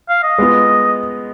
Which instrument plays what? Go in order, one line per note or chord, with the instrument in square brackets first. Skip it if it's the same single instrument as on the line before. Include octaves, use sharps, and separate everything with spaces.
[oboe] F5
D#5
[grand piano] G#3 B3 F4